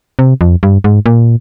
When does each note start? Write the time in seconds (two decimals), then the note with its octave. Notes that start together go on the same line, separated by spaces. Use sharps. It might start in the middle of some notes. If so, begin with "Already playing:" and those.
0.19 C3
0.41 F2
0.63 G2
0.84 G#2
1.06 A#2